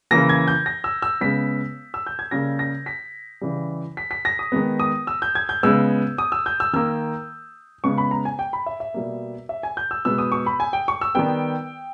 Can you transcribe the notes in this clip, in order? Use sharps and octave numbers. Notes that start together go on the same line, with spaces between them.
C#3 E3 A#3 A#6
G#6
G6
A#6
E6
E6
C#3 G#3 B3 B6
E6
G6
G#6
C#3 G3 A#3 A#6
A#6
B6
C#3 E3 G3
B6
B6
A#6
D#6
D#3 G#3 B3
D#6
E6
G6
G#6
G6
C#3 G#3 B3 E6
D#6
E6
G6
E6
D#3 A#3 E6
C#3 G#3 B3 C#6
B5
A#5
G#5
G5
B5
E5
E5
B2 G3 A#3
E5
G#5
G6
E6
B2 G#3 B3 E6
D#6
C#6
B5
G#5
G5
C#6
E6
D#3 G3 B3 G5